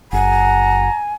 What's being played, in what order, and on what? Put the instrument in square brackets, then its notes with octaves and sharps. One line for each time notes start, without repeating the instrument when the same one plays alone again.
[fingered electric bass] F#1 [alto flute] F#5 [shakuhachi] G#5 [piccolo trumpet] A#5